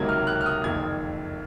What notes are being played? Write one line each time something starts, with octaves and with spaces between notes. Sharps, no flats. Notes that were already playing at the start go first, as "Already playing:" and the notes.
Already playing: C#2 C3 D#3 F#3 A#3 G#6
F6
F#6
F6
D#6
F#1 F2 D#3 G#6